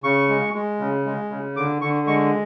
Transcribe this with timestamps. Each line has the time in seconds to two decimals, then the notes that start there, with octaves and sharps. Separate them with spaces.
0.04 C#3 C#6
0.29 G#3
0.54 G#3
0.80 C#3
1.06 G#3
1.31 C#3
1.56 D3 D6
1.81 D3 C#6
2.07 G#3 C#6